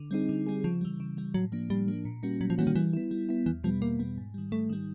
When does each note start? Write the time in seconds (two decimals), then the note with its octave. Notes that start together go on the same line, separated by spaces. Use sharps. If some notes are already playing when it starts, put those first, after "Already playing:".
Already playing: D3
0.11 G3 C4 D#4 G#4
0.29 D3
0.46 G3 C4 D#4 G#4
0.64 C#3 F3
0.81 E3 G3
1.00 C#3
1.17 E3 G3
1.34 A2 F#3
1.52 F3 A#3 D4
1.70 A2 G3
1.88 F3 A#3 D4
2.05 A#2
2.23 G3 A#3 C#4 F#4
2.41 A#2 F#3
2.50 F3
2.58 E3 G3 A#3 C#4 F#4
2.67 D#3
2.75 E3 G3
2.93 B3 E4
3.11 G3
3.29 B3 E4
3.46 E2 E3
3.64 B2 F3 G3 B3
3.82 E2 A#3
3.99 B2 G3 B3
4.18 G#2
4.34 D#3 G3
4.52 G#2 A3
4.70 D#3 G3